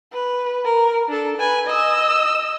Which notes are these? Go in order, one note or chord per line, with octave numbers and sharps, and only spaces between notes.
B4
A#4
D4 A4
B4 G#5
D#5 E6